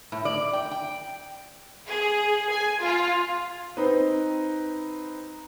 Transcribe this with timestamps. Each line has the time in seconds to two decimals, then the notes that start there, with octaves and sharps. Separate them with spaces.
0.12 A2
0.25 D5
0.53 G5
0.71 G5
1.88 G#4
2.51 G#5
2.81 F4
3.77 C4 D#4 B4